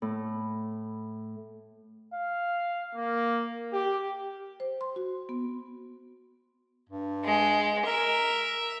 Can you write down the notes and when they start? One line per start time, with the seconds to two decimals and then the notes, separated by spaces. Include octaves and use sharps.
0.02 A2
2.14 F5
2.95 A#3
3.73 G4
4.60 C5
4.81 C6
4.96 F#4
5.29 B3
6.89 G2
7.25 G#3
7.87 A#4 E5